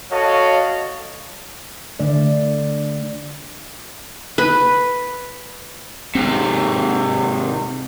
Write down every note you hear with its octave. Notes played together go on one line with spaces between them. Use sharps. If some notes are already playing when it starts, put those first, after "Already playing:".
F#4 A4 C#5 D#5 F5
D3 A3 D5
B4
G#2 C3 C4